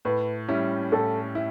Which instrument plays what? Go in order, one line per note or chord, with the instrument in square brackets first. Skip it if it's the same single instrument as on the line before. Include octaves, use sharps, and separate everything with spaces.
[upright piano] A2 [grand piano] B4
[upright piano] G3 C#4 E4
[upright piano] A2 [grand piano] A4
[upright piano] E4